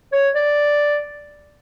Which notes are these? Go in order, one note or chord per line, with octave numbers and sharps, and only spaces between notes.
C#5
D5